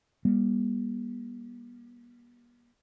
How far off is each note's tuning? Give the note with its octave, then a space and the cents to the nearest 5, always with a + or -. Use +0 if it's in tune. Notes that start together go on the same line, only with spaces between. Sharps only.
G3 +20 B3 -45